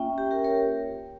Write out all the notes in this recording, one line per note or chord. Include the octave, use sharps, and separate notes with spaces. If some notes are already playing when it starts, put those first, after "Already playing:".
Already playing: A#3 C#4 F4 E5 G5
G4
G4 A#4
A#4 C#5